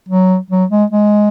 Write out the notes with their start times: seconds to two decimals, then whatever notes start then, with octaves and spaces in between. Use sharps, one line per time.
0.09 F#3
0.50 F#3
0.70 G#3
0.90 G#3